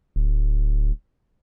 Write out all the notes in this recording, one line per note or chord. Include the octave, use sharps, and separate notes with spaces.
D1